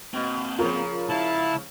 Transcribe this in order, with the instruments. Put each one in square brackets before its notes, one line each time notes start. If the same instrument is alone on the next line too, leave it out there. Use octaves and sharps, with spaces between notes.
[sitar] B2 [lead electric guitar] A#3 C4
[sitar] C#3 F3 [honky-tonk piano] F4 A#4
[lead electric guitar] C#2 F5 [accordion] E4 A5